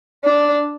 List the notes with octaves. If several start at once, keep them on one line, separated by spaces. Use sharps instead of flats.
D4